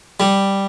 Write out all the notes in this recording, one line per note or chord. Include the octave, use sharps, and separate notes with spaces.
G3